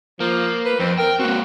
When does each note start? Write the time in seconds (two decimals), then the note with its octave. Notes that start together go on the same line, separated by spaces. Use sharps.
0.20 F3 A#3
0.65 B4
0.79 F2 C4
0.98 A#4 G5
1.19 A#3 C4 F#4